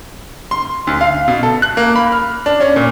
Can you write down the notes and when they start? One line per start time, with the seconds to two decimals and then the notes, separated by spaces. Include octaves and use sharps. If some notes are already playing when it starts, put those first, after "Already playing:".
0.51 C6
0.87 D2
1.01 F5
1.28 B2
1.43 A4
1.62 F#6
1.77 A#3
1.96 B5
2.12 F6
2.46 D4
2.61 C#4
2.76 A#2